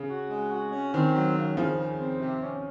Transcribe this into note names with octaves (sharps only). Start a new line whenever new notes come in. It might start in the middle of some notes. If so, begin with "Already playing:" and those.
Already playing: C#3
F#4
G#3
F#4
C#4
D#3 C4
F#3
C#3
C#3 F3
C#3
C4
C3
C#4